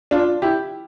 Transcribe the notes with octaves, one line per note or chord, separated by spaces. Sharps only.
D4 F4
E4 G4